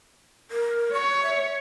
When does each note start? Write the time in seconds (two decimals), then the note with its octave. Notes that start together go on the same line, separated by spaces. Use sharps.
0.51 A#4
0.93 C#5 C#6
1.23 E5